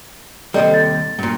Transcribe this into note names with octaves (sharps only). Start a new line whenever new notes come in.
D#2 C3 G3 A4 D5 D#5
A6
G2 A#2